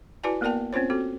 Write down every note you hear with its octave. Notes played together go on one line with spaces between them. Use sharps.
E4 F#4 B4 D5 G#5 A5
A#3 B3 A#4 D5 G5 A5
C4 C#4 F4 C5 C#5
C4 F#4 A4